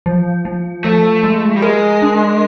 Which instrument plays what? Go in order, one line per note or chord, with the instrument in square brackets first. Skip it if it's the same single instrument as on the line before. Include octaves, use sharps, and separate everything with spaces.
[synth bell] F3
F3
[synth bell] F3 [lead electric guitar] A3
[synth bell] G#3
[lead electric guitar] G3
[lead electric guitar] G#3 [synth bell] A#4
[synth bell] D4